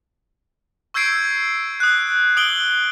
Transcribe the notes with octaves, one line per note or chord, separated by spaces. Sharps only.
C#6 E6 G6 G#6 C7 D7
D#6 F#6
D#6 D7 F#7 G7